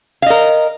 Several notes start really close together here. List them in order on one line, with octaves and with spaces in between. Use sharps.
F5 D#5 A#4